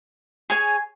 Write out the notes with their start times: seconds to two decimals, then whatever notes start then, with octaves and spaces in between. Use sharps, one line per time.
0.50 G#4 C#5 G#5